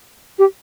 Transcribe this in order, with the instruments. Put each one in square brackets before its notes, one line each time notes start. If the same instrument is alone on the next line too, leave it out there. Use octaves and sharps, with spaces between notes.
[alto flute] G4